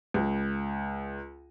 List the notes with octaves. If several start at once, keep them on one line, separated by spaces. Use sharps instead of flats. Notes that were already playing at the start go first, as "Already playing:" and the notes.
C#2